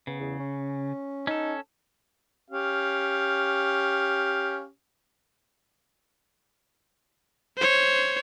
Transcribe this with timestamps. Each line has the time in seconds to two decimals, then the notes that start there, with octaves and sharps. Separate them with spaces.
0.07 C#3 B3
0.20 E2
0.40 C#4
1.27 C#4 D#4 A4
2.50 C#4 G4 F5
7.57 C5 C#5